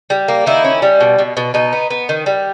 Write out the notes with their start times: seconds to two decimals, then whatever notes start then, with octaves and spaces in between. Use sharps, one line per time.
0.10 G3
0.28 A#3
0.46 D#3 E4
0.64 C#4
0.82 G3
1.00 B2
1.19 B2
1.37 B2
1.54 B2 D#4
1.73 B3
1.90 B3
2.09 D#3
2.26 G3